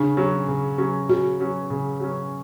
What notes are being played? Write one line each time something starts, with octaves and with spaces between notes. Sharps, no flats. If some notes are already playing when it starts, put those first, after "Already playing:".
Already playing: C#3 D4
F#3 C#4
C#3
F#3 C#4
C#3 F#4
F#3 C#4
C#3
F#3 C#4